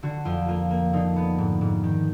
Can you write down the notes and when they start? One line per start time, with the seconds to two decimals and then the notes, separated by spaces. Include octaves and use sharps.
0.03 D3 F#4
0.25 F2 F4
0.48 A#3 F4
0.71 A#3
0.93 D3 D#4
1.16 B3
1.38 G#2
1.61 G#2
1.84 D#3